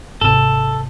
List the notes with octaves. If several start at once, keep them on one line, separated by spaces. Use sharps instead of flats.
G#1 C3 A4